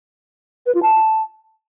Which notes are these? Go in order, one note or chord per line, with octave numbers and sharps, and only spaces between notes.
B4
F4
A5